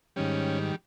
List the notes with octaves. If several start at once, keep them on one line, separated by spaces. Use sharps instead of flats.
G#2 D#3 G3 C#4